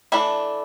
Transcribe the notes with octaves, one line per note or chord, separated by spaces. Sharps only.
E3 A3 D4 E4